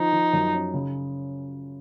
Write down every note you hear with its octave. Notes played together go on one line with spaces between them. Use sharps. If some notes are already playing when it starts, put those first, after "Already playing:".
Already playing: F3 D#4
F3
F#2
C#4
C#3